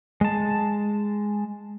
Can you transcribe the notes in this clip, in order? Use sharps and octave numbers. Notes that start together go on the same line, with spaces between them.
G#3 A5